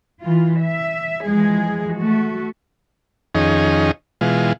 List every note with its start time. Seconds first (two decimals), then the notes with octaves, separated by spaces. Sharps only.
0.21 E3 F4
0.61 E5
1.27 E3 F3 G#3 G#4
1.96 A3 F#4
3.35 F2 D#3 C#4 D#4 G#4
4.21 B2 E3 G#3 F4